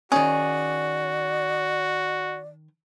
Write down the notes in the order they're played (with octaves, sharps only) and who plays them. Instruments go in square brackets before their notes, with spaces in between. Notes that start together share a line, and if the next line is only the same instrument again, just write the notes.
[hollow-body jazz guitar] D#3 C#4 [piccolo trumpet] F#4 [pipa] G#4 [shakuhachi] D5